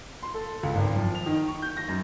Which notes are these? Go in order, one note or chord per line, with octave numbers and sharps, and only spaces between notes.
C6
A4
C#2
G#1
F3
F7
D#3
C#6
G6
A#6
F#2